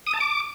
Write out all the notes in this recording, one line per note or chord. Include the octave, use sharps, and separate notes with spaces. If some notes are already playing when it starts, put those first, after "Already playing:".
D#6
A5
D6